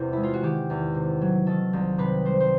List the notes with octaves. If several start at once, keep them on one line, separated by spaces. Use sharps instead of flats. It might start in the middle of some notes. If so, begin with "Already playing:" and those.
Already playing: E2 C3
G#3 E4
F4
F#4
D#3 G4
E2
C3
F#3
D#3 A4
C2
C3 B4
G3 C5
C5